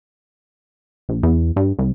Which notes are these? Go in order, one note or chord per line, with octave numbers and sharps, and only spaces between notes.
A#1
E2
G2
C2